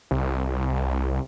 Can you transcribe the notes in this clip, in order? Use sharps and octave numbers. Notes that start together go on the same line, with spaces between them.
C2